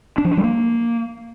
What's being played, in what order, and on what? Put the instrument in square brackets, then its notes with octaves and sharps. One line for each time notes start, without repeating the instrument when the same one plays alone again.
[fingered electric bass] D4
F3
D4
G3
A#3